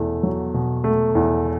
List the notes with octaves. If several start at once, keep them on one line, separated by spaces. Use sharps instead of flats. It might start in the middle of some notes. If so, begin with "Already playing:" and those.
Already playing: E2 B2 A3
F#3
B2
A3
E2